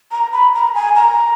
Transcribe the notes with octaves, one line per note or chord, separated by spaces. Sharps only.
A#5
B5
A#5
G#5
A#5